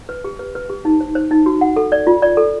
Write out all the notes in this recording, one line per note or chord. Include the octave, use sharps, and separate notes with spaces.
B4
G4
B4
B4
G4
D#4
C5
C5
D#4
F#4
F#5
A4
D5
F4
D5
A4